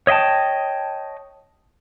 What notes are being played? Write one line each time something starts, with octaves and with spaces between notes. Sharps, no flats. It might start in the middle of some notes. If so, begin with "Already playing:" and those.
C#5 D#5 E5 G5 A5